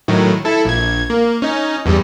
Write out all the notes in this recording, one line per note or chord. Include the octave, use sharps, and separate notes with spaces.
A2 D#3 F#3
E4 A4
A#1 G#6
A#3
C#4 D#4
E2 G2 G3